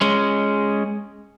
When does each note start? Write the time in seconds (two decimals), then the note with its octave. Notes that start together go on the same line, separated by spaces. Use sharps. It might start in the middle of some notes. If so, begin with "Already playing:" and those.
0.01 G#3 C#4